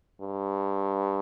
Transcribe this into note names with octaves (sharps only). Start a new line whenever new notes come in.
G2